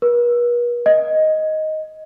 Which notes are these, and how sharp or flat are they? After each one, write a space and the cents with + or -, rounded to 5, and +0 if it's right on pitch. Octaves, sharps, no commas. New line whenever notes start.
B4 -45
D#5 +5